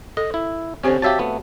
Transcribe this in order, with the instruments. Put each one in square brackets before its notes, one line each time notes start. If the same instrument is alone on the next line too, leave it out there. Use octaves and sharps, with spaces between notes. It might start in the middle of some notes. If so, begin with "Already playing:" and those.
[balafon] A4 [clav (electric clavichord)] D#5
[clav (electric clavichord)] E4
[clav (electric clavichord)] D3 C#4 [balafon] C4 G4 C5
[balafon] F#4 C#5 F5 [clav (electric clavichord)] G4 E5 A5
[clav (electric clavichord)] A3 B3